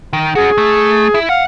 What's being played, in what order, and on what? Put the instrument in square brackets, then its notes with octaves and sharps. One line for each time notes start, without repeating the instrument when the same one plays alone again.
[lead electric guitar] D#3
[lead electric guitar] C#4 F#4 [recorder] G#4
[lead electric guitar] A3
E4
[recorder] F5 [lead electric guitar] F#5